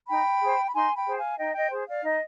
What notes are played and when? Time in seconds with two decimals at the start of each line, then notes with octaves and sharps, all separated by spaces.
0.08 D#4 G5 B5
0.42 G#4 C5
0.66 B5
0.73 D#4 G#5 C6
0.96 G5 B5
1.06 G#4 C5
1.17 F5 G#5
1.39 D#4 D#5 G5
1.55 D#5 G5
1.71 G#4 C5
1.88 D5 F5
2.04 D#4 D#5